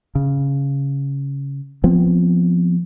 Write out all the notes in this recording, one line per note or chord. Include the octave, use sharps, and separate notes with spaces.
C#3
F3 B3 C4